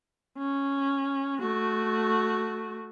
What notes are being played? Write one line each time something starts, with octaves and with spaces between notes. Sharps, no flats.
C#4
A3 F#4